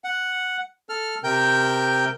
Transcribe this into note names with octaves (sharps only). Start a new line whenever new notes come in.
F#5
A4 F6
C3 A#4 G5 G6